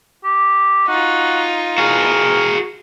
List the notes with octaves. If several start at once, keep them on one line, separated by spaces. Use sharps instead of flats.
G4
D#4 F4 F#4
F#4 G#4 A#4